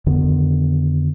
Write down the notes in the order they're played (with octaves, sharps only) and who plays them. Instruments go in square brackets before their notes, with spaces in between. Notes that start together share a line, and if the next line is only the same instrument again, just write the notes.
[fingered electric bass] F2 D3 D#3 B3